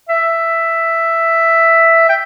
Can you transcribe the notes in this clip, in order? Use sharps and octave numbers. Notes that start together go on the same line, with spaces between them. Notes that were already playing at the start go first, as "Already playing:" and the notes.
E5
G5